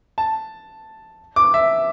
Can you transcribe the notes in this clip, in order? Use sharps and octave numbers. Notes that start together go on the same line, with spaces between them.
A5
D6
E5